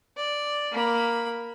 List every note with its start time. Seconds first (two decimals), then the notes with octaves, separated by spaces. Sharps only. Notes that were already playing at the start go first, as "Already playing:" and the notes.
0.17 D5
0.72 A#3 B5